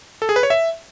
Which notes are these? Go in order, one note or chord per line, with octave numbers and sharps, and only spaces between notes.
A4
G#4
B4
C#5
E5